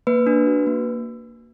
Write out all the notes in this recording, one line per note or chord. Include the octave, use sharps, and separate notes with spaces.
A#3 B4
D4
F#4
A#3